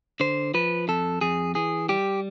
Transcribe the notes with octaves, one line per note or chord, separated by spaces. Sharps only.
D3 C5
F3 B4
F2 A4
F2 G#4
E3 G#4
G3 G4